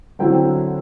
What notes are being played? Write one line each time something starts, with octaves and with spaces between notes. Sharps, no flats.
D3 F#3 C4 E4 G5